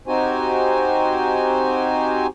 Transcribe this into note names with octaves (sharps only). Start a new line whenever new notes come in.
C4 D#4 F#4 G4 C5 G#5